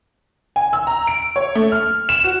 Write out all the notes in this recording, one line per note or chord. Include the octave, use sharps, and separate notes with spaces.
G#5
E6
A#5
D7
C#5
A3
F6
E7
F#4